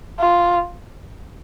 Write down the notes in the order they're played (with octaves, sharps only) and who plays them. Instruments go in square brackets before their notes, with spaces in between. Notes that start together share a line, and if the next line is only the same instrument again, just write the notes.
[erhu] F4